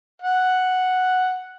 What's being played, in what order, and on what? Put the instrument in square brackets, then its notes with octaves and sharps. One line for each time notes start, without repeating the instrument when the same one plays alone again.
[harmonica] F#5